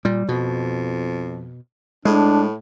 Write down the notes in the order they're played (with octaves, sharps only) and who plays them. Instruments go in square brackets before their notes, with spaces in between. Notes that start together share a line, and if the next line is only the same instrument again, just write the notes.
[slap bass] A#2 G3
[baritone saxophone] F2 [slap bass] B2
[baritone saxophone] A2 [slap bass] G#3 [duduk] D4